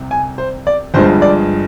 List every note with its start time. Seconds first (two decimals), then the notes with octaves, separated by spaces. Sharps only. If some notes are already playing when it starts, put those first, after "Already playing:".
Already playing: C2 C3
0.11 G#5
0.38 C5
0.67 D5
0.94 G1 G2 F3 G#3 C5
1.22 D5